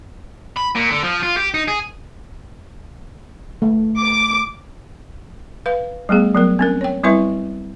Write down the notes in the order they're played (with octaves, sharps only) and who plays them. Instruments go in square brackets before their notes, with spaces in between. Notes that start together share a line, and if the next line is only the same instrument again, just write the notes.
[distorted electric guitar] B5
A#2
D3
F3
F4
G4
D#4
G#4
[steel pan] A3
[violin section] D6
[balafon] B4 F5
G3 A3 B3 G#4
F#3 B3 A#4
C4 C#4 A#4
C#5 G5
G3 C4 E4 B4 E5 C#6